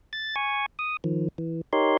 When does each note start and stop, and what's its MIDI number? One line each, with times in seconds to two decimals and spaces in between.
0.13 0.35 93
0.36 0.66 80
0.36 0.66 85
0.79 0.97 87
1.04 1.28 51
1.04 1.28 53
1.38 1.61 52
1.73 1.97 63
1.73 1.97 67
1.73 1.97 70
1.73 1.97 73
1.73 1.97 84